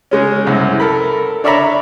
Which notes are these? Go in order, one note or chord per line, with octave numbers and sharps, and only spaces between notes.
C#3 G#3 C#4
C2 F#2
A4 A#4 B5
D4 C#5 D5 E5 A#5 B5